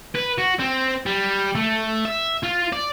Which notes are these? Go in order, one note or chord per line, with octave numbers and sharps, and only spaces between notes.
B4
F#4
C4
G3
A3
E5
F4
D5